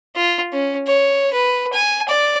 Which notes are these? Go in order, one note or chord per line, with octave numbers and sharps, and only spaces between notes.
F4
C#4
C#5
B4
G#5
D5